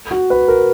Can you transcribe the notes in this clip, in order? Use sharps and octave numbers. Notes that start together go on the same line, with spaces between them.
F#4
B4
A#4